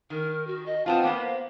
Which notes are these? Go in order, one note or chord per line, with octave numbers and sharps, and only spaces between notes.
D#3 A#4
F#4
D#5
B3 C4 F4 A5
A#3 B3 C5 F5